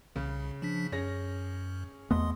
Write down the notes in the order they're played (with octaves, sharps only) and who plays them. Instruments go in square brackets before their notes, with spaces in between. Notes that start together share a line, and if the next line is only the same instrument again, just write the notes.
[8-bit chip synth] C2 [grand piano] C#3
[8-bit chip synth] F3 D4 B6
[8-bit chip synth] F#2 [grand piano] C#4 G#4 A#6
[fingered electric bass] E2 A3 B3 [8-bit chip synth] D#5 C6 D#6